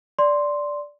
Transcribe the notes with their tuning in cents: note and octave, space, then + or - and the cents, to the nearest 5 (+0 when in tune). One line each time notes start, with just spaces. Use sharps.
D5 -5 C6 +0